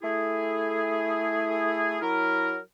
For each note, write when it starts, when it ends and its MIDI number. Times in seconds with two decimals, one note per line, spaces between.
0.03 1.98 57
0.03 1.98 64
0.03 1.98 68
2.01 2.58 54
2.01 2.58 64
2.01 2.58 70